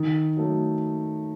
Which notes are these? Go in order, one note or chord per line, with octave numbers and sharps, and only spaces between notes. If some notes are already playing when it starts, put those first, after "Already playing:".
Already playing: D#3
F#3 A3